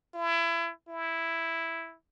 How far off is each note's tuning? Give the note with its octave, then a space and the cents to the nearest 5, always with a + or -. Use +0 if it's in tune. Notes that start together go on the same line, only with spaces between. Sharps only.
E4 +30
E4 +0